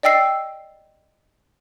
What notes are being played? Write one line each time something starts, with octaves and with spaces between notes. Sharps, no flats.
D5 D#5 G5 E6 C7